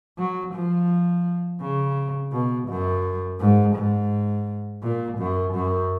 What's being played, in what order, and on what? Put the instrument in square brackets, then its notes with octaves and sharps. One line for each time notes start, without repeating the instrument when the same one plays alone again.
[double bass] F#3
F3
C#3
B2
F#2
G#2
G#2
A#2
F#2
F#2